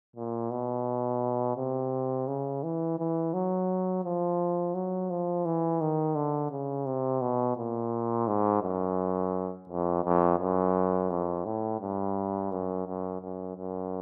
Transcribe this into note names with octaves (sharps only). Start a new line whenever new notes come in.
A#2
B2
C3
C#3
E3
E3
F#3
F3
F#3
F3
E3
D#3
D3
C#3
C3
B2
A#2
G#2
F#2
F2
F2
F#2
F2
A2
G2
F#2
F#2
F#2
F#2